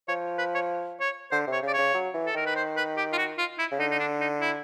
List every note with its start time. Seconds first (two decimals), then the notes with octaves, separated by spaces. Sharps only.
0.08 F3 C#5
0.39 B4
0.54 C#5
1.00 C#5
1.32 D3 C5
1.47 C3
1.52 C#5
1.63 C#3 D5
1.73 C#3 C#5
1.94 F#3
2.14 E3
2.26 A4
2.35 D#3 A#4
2.46 B4
2.56 C5
2.77 B4
2.97 G4
3.13 F4
3.18 F#4
3.38 F4
3.59 E4
3.72 C#3
3.79 D3 D#4
3.91 D#4
4.00 D4
4.20 D#4
4.41 E4